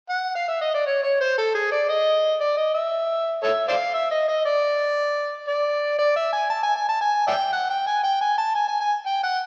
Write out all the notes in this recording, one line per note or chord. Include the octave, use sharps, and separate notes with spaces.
F#5
F5
E5
D#5
D5
C#5
C#5
C5
A4
G#4
D5
D#5
D5
D#5
E5
A4 C#5 E5
C5 D5 F5
E5
D#5
D#5
D5
D5
D5
E5
G#5
A5
G#5
G#5
A5
G#5
D5 E5 G5
F#5
G5
G#5
G5
G#5
A5
G#5
G#5
G#5
G5
F#5